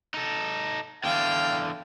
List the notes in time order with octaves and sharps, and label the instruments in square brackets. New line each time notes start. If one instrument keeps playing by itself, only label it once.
[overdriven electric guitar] D#4 A4
[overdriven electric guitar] E2 D3 [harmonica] F5 G5